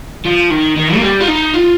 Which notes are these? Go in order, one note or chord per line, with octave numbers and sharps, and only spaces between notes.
F3
D#3
D#3
A#3
G3
F4
D#4
F4